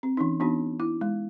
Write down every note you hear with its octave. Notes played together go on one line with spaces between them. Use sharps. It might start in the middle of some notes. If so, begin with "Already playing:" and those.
C4
E3 C#4 D#4
E3 B3 D4 D#4 F#4
E4
G#3